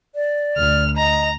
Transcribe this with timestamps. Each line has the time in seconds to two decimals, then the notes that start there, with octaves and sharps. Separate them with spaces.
0.15 D5
0.57 D2 F6
0.97 D#5 A#5